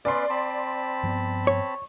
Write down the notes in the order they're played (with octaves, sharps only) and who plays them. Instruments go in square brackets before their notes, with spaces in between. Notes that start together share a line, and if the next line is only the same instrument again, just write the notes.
[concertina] B3 C#4 B4 [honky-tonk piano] D5 C6
[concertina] C4 A5 B5
[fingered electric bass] G2 F3 B3
[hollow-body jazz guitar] C#5